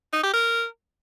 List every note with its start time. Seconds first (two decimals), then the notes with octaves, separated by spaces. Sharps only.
0.13 D#4
0.23 G4
0.34 A#4